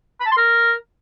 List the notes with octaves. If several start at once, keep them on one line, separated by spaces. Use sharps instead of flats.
B5
A5
C6
A#4